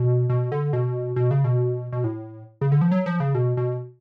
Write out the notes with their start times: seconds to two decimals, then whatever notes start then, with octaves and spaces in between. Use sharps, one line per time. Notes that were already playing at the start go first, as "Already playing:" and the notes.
Already playing: B2
0.30 B2
0.52 D3
0.73 B2
1.16 B2
1.31 C#3
1.44 B2
1.92 B2
2.04 A2
2.61 C#3
2.72 D3
2.81 F3
2.92 F#3
3.06 F3
3.20 C#3
3.35 B2
3.57 B2